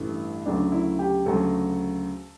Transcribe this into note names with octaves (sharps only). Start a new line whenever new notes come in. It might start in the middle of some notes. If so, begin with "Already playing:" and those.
Already playing: A1 G2 E3 A3
D2 C#3 F#3 A3 D4
E4
G4
D2 C#3 F#3 A3 A4